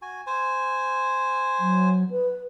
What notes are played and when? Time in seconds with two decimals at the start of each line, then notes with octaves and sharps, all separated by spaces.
0.02 F#4 G#5
0.27 C5 G#5
1.59 F#3
2.11 B4